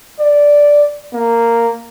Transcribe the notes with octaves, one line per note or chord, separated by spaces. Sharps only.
D5
A#3